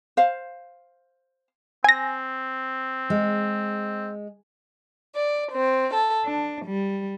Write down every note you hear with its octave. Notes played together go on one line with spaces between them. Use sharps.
C5 F5
C4 G#5 A#6
G#3
D5
C4
A4
D4
G3